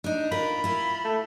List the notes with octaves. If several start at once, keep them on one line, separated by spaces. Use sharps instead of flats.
D4 D#4
F4 A#4 B5
E4 F4
A3